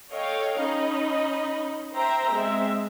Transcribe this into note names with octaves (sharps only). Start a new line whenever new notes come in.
A4 C#5 D#5 F5 G5
C#4 D#4 D#5 B5
C5 E5 G5 A#5
G#3 C4 E5